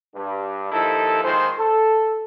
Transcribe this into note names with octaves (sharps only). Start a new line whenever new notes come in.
G2
D#2 F3 D#4 E4 A4
A#2 D#3 G#3 C5
A4